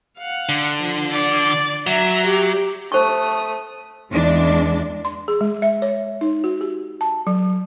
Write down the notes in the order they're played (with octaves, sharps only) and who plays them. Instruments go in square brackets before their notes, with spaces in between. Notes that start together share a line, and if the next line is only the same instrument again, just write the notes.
[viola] F5 F#5
[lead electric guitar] D3
[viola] F3
D5
[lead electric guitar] F#3 [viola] E5 A#5
[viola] G4
[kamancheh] A3 D#6 [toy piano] C5 C#6
[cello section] E2 G#3 D4
[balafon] C6
G#4
G#3
E5
C#5
D#4
F#4
G4
A5
F#3